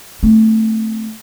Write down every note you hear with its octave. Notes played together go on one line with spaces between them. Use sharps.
A3 C4